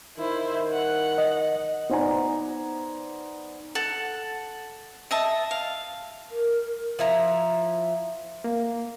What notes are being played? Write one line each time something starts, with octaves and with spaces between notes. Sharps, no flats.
D#3 E4 C5
F#5
D#5
B3 D#4 C5 D5 G#5 A#5
A4 F#5
D#5 E5 A5
F5
A#4
F3 E4 A#5
A#3